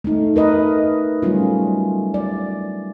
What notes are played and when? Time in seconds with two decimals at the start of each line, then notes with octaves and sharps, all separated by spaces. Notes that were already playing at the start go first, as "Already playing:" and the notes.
0.04 A3 D#4
0.36 A#4 B4 D#5
1.22 F#3 G3 A3 C#4 F4
2.14 D5